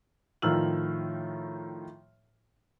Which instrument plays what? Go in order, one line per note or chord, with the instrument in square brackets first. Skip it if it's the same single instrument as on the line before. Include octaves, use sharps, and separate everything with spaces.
[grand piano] A2 D#3 F3 E6 F6 F#7